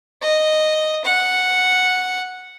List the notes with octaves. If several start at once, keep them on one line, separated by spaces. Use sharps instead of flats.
D#5
F#5